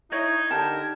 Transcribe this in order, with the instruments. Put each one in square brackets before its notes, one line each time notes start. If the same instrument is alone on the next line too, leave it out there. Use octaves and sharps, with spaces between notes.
[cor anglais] D#4 [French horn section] E4 [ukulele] C#5 D#5 [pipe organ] G#6
[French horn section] D3 D#4 [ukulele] G4 A5 [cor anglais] A#4